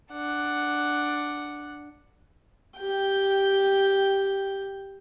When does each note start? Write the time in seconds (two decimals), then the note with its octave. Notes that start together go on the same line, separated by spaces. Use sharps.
0.12 D4 F#5
2.77 G4 G5